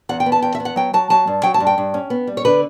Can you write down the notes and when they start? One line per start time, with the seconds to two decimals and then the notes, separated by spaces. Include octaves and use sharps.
0.09 E2 F#5
0.20 G5
0.26 B3
0.32 A5
0.42 E2 G5
0.55 E5
0.60 B3
0.65 F#5
0.76 F#3 G5
0.94 F#3 A5
1.10 F#3 A5
1.27 G2
1.43 F#3 G5
1.54 A5
1.60 G2
1.67 G5
1.78 G2
1.94 C#4
2.10 B3
2.27 G3
2.37 C#5
2.45 D3 B4